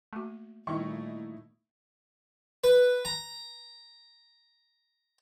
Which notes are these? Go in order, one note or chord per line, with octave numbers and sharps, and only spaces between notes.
A3 A#3 F#4
A#2 D#3 G3 A3 A#3 D#4 E4 C#6
B4
A#5